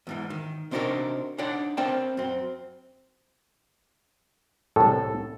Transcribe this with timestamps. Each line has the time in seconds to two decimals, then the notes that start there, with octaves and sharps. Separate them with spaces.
0.07 E2 G#2 E3
0.30 D#3
0.71 C3 C4 D4 D#4 F#4 A#4
1.38 D4 D#4 C#5 D5 F#5
1.77 C4 A#4 D5 E5 G5 A5
2.17 F#2 C4
4.76 C2 A2 A4